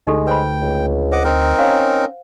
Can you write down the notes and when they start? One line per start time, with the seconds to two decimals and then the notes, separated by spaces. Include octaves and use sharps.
0.07 D2 G#3 D#4 G4 A4
0.27 B4 C5 G5 B5
0.61 C#2
1.12 C5 D#5 F#5 D6
1.24 C4 D#4 A#4
1.58 C#4 C5 F5 F#5